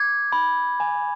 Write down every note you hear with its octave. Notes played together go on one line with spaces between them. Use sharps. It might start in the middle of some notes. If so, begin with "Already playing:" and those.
Already playing: D6 G#6
B5
G#5